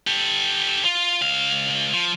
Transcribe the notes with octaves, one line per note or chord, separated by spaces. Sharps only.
G4 A4
F4
C#2 F5
F3